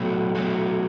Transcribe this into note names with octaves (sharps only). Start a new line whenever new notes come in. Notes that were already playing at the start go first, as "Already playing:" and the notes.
Already playing: B2 F#3 A3 A4 C#5
B2 F#3 A3